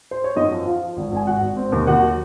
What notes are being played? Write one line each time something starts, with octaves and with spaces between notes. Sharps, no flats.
C5
C#5
F#2 D#4 D#5
F3
F3 F4 F5
F3
G#1
G#1 G#5
G#1 F#4 F#5
G#1
C4
D#2
D#2 F#4 F#5
F#3